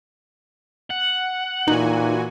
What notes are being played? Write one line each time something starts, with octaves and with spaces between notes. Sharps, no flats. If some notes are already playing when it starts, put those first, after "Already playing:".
F#5
A#2 E3 D#4 F#4 G#5